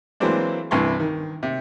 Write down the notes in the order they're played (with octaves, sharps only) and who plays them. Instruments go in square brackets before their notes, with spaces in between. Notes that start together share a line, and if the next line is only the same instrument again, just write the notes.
[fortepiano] E3 F#3 G#3 A#3 C4 D4
C2 G2 E3 G#5 C6 C#6
D#3
C3